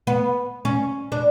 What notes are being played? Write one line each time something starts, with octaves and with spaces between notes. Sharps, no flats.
B3
C#4
D4